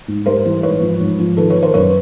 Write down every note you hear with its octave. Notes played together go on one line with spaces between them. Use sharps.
G#2
G3 A#4 C5
E3
G#2 B4 C#5
F3
G#2
F3
D#3 A4 B4
B4 C#5
D#3
A#4 C5
F#2 B4 C#5